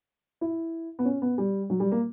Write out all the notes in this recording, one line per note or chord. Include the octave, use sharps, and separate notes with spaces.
E4
B3
C#4
B3
G3
F#3
G3
A#3